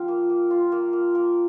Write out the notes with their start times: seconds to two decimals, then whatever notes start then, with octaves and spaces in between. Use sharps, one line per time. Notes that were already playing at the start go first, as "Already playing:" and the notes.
Already playing: F3 F5 G5
0.08 A#3
0.29 A#3
0.51 F4
0.72 A#3
0.93 A#3
1.15 A#3 A#4